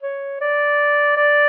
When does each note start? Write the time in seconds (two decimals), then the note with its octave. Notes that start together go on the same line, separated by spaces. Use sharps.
0.02 C#5
0.41 D5
1.17 D5